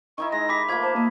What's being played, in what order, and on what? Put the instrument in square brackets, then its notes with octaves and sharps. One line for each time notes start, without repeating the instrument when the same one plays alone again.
[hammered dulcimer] D#3 D#4 E4 [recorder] C#6
[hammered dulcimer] G#3 [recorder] A#6
[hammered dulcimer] G4 [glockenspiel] B5 D6 B6
[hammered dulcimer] F3 A3 A#3 [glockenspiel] B5 G#6 B6
[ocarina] C5 [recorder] A5
[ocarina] A#3 [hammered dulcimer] D#5